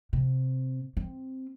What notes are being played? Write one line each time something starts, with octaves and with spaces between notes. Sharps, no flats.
C3
C4